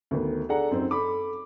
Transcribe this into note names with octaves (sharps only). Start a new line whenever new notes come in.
D2 D#3 B3
D4 G#4 A4 F#5 A#5
F#2 C4 D#4 C5
A4 B5 D6